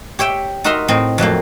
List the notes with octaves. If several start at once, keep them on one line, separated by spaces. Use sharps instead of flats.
G4 C#5 E5 G5
D#4 F#4 A#4 E5 A#5 C6
A2 C4 D#5
F2 F#3 A3 A#3